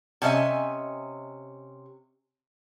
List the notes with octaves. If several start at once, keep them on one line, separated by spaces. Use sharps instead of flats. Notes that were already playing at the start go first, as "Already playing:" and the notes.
C3 C#4 D#5 E5 G#5